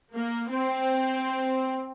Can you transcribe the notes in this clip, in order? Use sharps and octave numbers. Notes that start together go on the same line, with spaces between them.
A#3
C4